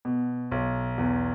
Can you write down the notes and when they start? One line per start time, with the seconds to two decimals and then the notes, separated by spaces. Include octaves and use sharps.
0.05 B2
0.51 B1
0.98 E2